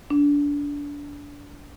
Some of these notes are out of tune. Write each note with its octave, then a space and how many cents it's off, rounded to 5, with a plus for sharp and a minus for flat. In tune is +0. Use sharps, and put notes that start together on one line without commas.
D4 -25